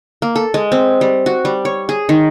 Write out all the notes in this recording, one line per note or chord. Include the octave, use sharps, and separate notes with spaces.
A#3
A4
G#3
C4
G3
F#4
G3
C#5
G#4
D#3